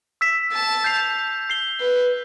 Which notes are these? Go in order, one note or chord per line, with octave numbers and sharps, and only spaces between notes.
E6 B6 E7
A5
G6 C7 F7
G6 C7 G7
B4